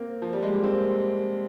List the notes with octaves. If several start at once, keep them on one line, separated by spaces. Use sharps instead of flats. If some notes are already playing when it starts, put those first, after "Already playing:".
Already playing: A#3 C4
F3
G3
G#3
A#3
C4